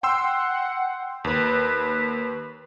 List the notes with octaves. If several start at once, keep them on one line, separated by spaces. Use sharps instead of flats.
F#5 G5 C6 E6
D#2 B4